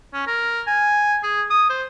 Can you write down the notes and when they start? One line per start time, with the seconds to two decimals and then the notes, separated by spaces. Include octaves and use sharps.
0.13 C#4
0.27 A#4
0.67 G#5
1.23 G#4
1.50 D#6
1.70 C5